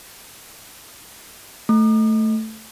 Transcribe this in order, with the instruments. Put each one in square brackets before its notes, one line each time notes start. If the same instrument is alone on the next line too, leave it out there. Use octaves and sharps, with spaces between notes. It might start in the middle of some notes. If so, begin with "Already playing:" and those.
[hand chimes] A3